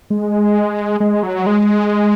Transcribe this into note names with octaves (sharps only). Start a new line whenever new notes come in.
G#3
G#3
F#3
G#3